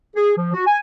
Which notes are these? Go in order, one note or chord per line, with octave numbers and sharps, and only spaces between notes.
G#4
F3
F#4
G#5